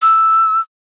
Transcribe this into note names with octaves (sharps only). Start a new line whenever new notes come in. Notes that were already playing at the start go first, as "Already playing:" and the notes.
E6